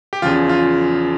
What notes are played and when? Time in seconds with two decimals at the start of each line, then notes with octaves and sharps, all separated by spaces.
0.13 G4
0.22 E2 C#3 F3 F4
0.49 F4